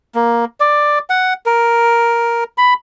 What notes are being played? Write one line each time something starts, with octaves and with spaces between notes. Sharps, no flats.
A#3
D5
F#5
A#4
B5